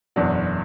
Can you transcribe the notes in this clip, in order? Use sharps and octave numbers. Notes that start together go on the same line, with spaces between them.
F#1 E2 B2 F#3 D4